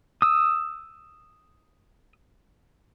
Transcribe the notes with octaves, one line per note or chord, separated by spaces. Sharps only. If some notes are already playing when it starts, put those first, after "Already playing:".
D#6 E6